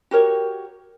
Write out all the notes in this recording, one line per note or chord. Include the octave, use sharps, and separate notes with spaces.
F#4 G4 A#4 C#5